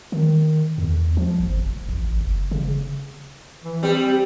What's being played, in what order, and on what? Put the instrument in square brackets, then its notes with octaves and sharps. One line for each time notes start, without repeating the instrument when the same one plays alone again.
[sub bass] D#3
E2
F3
G#1
F1
A1
F#1
C#3
[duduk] E3
[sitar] G3 [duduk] C4